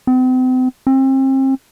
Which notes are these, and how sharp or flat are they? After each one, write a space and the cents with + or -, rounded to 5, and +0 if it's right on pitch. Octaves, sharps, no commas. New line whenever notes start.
C4 -40
C4 +35